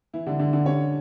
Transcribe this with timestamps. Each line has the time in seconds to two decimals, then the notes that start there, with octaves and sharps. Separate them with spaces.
0.14 E3 E4
0.26 D3 D4
0.39 D3 D4
0.53 D3 D4
0.66 C#4 C#5